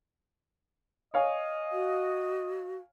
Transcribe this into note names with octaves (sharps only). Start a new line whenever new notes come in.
C#5 D#5 F5 G#5
F#4